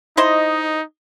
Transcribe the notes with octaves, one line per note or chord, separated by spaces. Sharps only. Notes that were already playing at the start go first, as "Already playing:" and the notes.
D#4 E4 C5 D#5